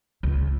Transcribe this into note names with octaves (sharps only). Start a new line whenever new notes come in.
C#2